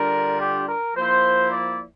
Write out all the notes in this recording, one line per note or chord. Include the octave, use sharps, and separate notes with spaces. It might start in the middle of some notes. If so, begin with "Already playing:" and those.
Already playing: D3 G3 D4 F4 A#4
G4
A#4
F3 A#3 E4 C5
D5